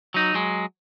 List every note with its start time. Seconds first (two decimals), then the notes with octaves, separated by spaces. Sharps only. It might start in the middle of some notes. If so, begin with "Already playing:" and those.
0.14 F#3 D#4
0.34 F#3 G#3